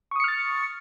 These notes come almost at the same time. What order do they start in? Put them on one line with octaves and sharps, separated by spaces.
C#6 D#6 C#7 F6 A6